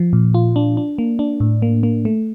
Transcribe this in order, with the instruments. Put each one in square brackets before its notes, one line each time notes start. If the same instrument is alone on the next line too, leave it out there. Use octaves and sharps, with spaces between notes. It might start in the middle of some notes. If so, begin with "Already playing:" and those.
Already playing: [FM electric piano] F3
A#2
F4
D4
D4
A#3
D4
A2
A#3
A#3
A3